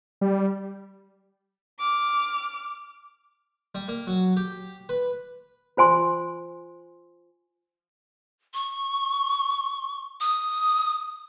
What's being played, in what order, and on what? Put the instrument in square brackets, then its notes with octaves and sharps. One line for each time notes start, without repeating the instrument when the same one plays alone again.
[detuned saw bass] G3
[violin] D6 F6
[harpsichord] G3
A#3
F#3
G4
B4
[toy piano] F4 C5 G#5 C6
[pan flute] C#6
D#6